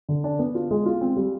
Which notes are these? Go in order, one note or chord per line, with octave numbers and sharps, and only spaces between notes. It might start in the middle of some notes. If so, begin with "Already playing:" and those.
D3
D4
B3
F4
G#3
F4
C4
G3